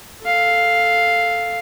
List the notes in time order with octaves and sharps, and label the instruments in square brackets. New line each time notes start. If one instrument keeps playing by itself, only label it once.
[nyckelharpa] A4 F5